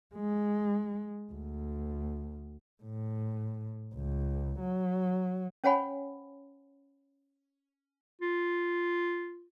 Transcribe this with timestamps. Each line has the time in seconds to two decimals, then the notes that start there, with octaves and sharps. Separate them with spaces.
0.15 G#3
1.32 D2
2.83 A2
3.95 C#2
4.60 F#3
5.64 C#4 C5 C#5 F#5 G#5 B5
8.21 F4